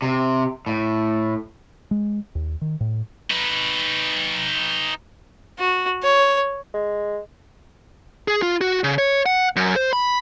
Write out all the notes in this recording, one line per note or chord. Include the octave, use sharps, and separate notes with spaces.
C3
A2
G#3
D#2
D#3
A2
D#4 B4
F#4
C#5
G#3
G#4
F4
F#4
C#3
C#5
F#5
F#2
C5
B5